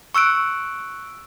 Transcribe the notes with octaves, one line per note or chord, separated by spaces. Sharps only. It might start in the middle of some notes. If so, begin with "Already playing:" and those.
C#6 E6 F#6 D7